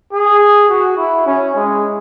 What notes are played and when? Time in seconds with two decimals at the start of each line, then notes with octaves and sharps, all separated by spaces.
0.12 G#4
0.68 F#4
0.98 E4
1.26 C#4
1.55 G#3